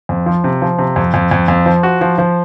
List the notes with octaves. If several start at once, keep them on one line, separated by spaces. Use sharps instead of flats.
F2
F3
C3
F3
C3
F2
F2
F2
F2
F3
F#4
F3
F3